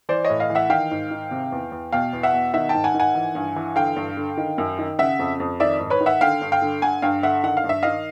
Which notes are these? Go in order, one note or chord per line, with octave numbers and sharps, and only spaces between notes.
E3 C5 D5
C#5 D#5
A2
D#5 F5
E3
E5 F#5
D#3 F5 G5
G#2
D#3
C3
E2
E2
B2 F5 G5
E2
E5 F#5
B2
D#3 E5 F#5
G5 A5
G#2
F#5 G#5
D#3
F#5 G#5
E3
G2
E3
D3 F5 G5
G2
D3
D#3
F#2
D#3
C#3 E5 F#5
F2
F2
D#3 D5 E5
G#2
B4 C#5
D#3
E5 F#5
D3 F5 G5
G2
F5 G5
D3
D3 F#5 G#5
G2 F5 G5
D3 E5 F#5
D#3 F#5
F5
G2
E5
D#3 D#5 F5